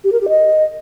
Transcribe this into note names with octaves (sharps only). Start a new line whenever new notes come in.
G4
A#4
G4
D#5